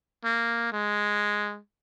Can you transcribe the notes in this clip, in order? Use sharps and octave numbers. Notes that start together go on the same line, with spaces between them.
A#3
G#3